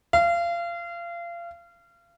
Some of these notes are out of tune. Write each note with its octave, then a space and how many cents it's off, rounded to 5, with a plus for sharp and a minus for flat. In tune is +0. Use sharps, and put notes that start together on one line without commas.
F5 -30